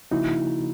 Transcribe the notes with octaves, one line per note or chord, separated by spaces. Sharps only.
C#3 F3 A#3 D#4 E4 F#4